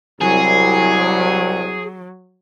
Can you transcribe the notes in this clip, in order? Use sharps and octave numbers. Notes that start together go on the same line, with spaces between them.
C2 F#3 G#4